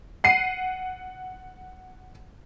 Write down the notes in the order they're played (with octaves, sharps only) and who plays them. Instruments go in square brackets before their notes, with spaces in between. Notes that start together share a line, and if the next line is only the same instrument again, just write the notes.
[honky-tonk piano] F#5 C7 D#7